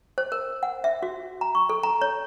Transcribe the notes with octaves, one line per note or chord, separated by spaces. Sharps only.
C5
A#4
F#5
E5
F#4
A#5
C#6
A4
A#5
C#5